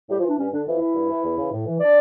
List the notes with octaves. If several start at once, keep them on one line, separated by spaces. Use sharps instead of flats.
A2 G3 G4
F3 F4
E3 D4
G2 C#4
D3 D4
F2 E3 E4
E3
G2
E3
E2
C#3 E3
A2
E3
D4 D5